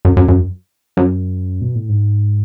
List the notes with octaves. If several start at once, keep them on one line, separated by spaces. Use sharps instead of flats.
F#2
F#2
F#2
F#2
B2
A2
G#2